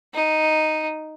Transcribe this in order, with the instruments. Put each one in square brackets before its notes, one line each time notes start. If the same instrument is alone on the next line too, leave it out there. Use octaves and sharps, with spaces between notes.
[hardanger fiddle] D#4